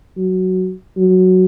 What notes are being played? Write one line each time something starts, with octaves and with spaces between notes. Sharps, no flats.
F#3
F#3